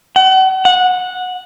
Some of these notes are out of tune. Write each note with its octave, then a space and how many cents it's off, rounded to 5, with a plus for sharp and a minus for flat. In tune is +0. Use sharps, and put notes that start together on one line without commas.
F#5 +40
F#5 -15